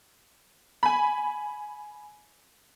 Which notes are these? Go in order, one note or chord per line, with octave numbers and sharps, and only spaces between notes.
G#5 B5